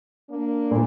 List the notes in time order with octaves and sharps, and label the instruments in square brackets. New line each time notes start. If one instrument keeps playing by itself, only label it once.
[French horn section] A#3 D4
[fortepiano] A#2